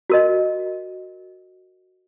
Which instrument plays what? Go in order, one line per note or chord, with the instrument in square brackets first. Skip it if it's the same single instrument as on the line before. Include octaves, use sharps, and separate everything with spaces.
[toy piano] F#4 A#4 D#5